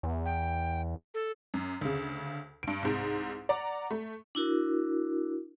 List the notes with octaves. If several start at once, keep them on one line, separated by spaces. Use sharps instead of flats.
E2
G5
A4
F#2
D2 C#3
G2 D7
C2 G#2
D5 F#5 A#5 D6
A3
D4 E4 F#4 A#4